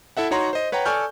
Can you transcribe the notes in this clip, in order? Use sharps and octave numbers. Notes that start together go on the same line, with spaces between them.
E4 A4 E5 F#5
D#4 F#4 C#5 F#5 A#5 C6
C5 D#5
B4 C#5 F#5 G5 A#5
A4 D5 G#5 C#6 F6 G6